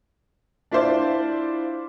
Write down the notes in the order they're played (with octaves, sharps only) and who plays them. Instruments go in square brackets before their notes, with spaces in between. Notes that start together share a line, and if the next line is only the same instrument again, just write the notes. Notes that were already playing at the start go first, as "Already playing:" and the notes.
[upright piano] D4 E4 F4 C5 D5